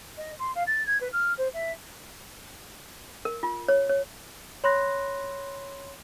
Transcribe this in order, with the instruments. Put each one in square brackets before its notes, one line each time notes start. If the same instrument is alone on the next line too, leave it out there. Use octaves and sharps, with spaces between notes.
[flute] D#5
C6
F5
A6
G#6
B4
F6
C5
E5
[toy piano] A#4
F4
C#5
C#5
[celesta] C#5 B5 C6 F#6 A#6